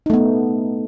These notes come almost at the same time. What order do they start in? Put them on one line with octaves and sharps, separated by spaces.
D#4 A3 B3